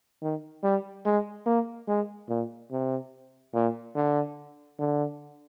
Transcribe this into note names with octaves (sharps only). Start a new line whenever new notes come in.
D#3
G3
G#3
A#3
G#3
A#2
C3
A#2
D3
D3